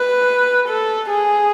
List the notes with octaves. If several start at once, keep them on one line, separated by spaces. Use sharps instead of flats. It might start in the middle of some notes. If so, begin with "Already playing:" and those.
Already playing: B4
A4
G#4